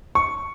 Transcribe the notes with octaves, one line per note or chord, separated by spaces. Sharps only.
C#6